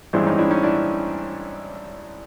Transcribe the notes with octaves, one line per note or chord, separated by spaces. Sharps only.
A1 G2 E3 G#3 C4 D4
C#4 D#4
D4 E4
C#4 D#4
D4 E4